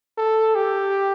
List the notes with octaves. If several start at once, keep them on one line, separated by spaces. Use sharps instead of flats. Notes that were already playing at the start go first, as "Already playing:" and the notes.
A4
G4